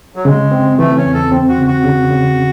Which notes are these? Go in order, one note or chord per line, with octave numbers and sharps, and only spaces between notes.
F#3
C#3 G#3
C4
E3 A3
C#4
E2
A4
C4
F#4
C#3
F#4
C#3
C#3